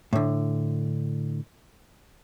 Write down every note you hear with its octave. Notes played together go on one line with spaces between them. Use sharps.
A2 D3